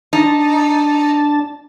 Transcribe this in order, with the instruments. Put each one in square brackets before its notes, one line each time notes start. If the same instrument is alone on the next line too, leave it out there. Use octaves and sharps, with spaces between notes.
[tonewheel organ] D4 A5 [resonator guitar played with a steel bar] D#4